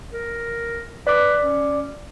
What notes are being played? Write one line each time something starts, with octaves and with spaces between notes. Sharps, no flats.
A#4
B4 D5 D6
C#4